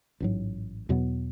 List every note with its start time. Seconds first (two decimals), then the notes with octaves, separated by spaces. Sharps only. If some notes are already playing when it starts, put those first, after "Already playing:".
0.20 A1 G#2 F#3
0.89 E2 B2 F#3 B3